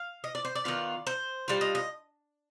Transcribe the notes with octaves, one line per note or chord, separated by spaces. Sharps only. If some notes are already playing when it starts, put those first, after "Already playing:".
Already playing: F5
D#5
D5
C5
D5
D#3 B3 F4
C5
G3 D4 F4
D#5
D#5